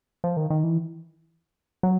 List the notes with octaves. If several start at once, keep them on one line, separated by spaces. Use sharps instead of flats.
F3
D#3
D#3
E3
F#3